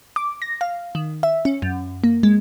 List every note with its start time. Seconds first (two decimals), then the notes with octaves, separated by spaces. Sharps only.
0.16 D6
0.42 A#6
0.61 F5
0.95 D#3
1.23 E5
1.45 C#4
1.62 F#2
2.04 A#3
2.23 G#3